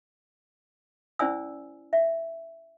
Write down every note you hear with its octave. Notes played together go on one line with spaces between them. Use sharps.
C#4 E4 C5 D5 G#5 E6
E5